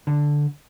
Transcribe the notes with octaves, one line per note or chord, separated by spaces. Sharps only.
D3